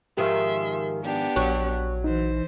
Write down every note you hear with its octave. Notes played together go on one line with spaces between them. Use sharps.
G#2 D#3 F3 G4 A#4 E5 C6
B3 D4 G4
A#1 F#3 C#6
E3 D#4 C5